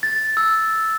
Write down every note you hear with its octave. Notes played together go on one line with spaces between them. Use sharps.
A6
E6